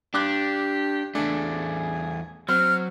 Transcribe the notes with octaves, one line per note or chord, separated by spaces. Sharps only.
G2 D4 G4 D6 F#6
E2 A3 D4 G#4
F#3 C4 F6